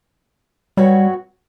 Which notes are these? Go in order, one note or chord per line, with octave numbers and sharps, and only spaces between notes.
G2 F#3 G3 B3 F#4 C#5